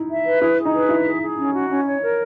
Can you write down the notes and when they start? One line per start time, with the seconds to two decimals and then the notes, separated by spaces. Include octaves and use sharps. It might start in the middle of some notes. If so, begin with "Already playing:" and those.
Already playing: D#4 E4
0.09 E5
0.25 B4
0.41 E4 G#4
0.58 G#4
0.65 D#4
0.73 B4
0.89 E4 E5
1.05 G#4
1.21 G#4
1.38 C#4
1.53 F#4
1.70 C#4
1.85 C#5
2.01 A#4